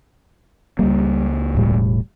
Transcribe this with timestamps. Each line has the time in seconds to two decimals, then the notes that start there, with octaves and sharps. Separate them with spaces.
0.79 C#2 G3 A#3
1.55 E1 A2 G3